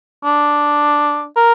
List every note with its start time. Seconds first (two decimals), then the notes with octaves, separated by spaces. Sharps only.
0.24 D4
1.36 A#4